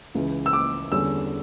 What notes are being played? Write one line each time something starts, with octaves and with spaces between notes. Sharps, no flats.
C#2 C#3 E3
E6
D6
E2 D3 G3 C#4 E6